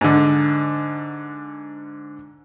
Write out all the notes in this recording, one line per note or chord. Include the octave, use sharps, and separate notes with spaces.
G#2 D3